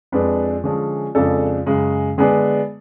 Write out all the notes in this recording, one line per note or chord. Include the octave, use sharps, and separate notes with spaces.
F2 F3 G#3 D4 B4
D3 F3 G#3 C#4
F2 C#3 F3 G#3 D4 A4
F#2 C#3 G#3
D3 G#3 B3 D4 G#4